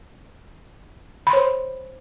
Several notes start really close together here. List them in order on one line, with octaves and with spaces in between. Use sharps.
B5 C6 C#5 C5